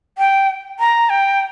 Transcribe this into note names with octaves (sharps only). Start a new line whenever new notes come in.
G5
A#5
G5